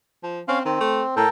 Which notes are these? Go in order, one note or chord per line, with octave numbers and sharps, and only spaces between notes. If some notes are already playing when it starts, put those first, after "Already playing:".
F3
C4 C#4 F5
D#3 C4
A3
A2 A4 A#4 G5